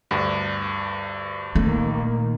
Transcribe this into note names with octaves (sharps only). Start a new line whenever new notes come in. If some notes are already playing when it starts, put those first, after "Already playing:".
D2 G2
A#2 D#3 A3 A#3